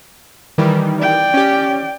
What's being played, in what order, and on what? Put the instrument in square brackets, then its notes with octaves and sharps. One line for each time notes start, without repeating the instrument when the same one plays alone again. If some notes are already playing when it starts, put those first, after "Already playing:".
[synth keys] D#3 E3 G3
[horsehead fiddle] D5 G5
[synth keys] C#4 G4